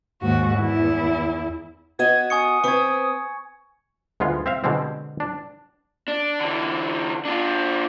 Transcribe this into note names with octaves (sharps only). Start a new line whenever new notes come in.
D#2 G#2 F#4
E2 E4
B3 F#4 D#5 G#6
G#5 C#6 D#6 C#7
C4 B4 C5 C#6 G#6
D2 G#3 B3 F4
C4 E5 F5
B2 D3 G3 G#3 C4
D4
D4
D3 E3
D4 F4